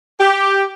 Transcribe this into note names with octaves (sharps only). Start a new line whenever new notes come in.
G4